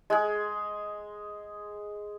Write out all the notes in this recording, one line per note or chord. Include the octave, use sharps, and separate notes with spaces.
G#3 G#4